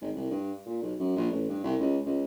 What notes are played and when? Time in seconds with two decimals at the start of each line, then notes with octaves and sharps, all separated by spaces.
0.01 G#1
0.15 C2
0.31 G2
0.66 A#2
0.82 B1
0.99 F#2
1.16 A#1
1.31 A1
1.49 G2
1.64 C2
1.80 C#2
2.05 C#2